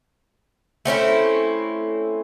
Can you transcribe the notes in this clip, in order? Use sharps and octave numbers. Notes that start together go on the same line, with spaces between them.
A3 C4 C#4 E4